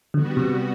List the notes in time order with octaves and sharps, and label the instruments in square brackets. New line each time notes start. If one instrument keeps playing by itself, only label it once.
[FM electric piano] D3 [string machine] G3 B3 F#4
[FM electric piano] C3